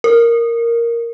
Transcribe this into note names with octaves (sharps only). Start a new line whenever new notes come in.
A#4